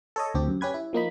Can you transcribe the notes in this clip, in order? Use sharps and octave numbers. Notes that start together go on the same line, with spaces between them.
A4 C#5 D#5
D2 C4 G4
F#2
C#4 G4 B4 G#6
E4
F3 A#3 D#4 B5